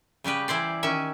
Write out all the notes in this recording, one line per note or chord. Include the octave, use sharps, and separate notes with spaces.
C#3 G3 G4 B4
E3 E4 C5 D5
D#3 C#4 E5